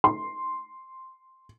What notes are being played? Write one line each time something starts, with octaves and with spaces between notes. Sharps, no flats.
C6